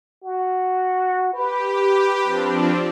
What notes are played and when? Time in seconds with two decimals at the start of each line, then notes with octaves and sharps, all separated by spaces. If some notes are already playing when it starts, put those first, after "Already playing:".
0.24 F#4
1.34 G4 B4
2.24 F3 C4 D4